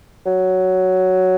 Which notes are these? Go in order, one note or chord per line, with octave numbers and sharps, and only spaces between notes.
F#3